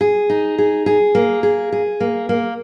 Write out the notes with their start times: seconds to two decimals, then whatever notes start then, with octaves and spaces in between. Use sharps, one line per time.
0.01 G#4
0.30 D#4
0.58 G#4
0.86 G#4
1.15 A#3
1.43 G#4
1.72 G#4
2.00 A#3
2.29 A#3